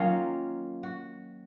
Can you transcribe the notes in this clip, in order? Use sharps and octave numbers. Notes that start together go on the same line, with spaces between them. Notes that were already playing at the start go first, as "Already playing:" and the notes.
Already playing: D#3 F#3 A#3 C#4 F4
F#4